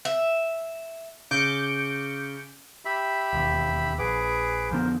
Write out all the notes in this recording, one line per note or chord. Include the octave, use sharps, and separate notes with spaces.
E5
C#3 D6 G6 C#7
G4 E5 B5
E1 D#2
A#1 G#4 B4 D6
F2 D3 B3 A#4 C5